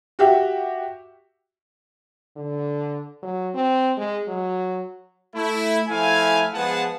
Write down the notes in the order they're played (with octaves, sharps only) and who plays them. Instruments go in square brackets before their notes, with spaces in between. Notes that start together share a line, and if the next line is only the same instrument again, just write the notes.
[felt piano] F#4 G4 E5
[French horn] D3
F#3
C4
G#3
F#3
[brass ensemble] A3 E4
F3 A3 E4 F5 G#5
F3 G#3 B3 G#4 F#5 A5